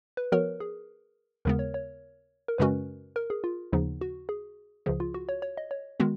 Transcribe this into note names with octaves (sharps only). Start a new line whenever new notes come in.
B4
F3 B3 F#4 A#4 C#5
G#4
D#2 C#3 G#3 B3 A#4
C#5
C#5
A#4
F#2 C#3 G#3 C#4 F#4 B4
A#4
G#4
F4
D#2 C#3 F3 B3 D#4
F#4
G#4
C#2 C#3 F3 G#4
F4
F#4
C#5
C#5
D#5
C#5
D#3 G#3 B3 F#4